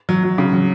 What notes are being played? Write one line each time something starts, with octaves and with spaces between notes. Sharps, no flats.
F#3
F#3
C#3
F#3